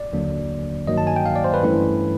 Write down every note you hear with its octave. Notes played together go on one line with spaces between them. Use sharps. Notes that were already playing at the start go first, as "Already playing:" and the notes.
Already playing: D5
D#2 D3 F#3 A#3 D4
G2 D#3 F#3 A#3 D#5
A5
G#5
G5
F5
D5
C5
B4
G2 E3 A3 C#4 E4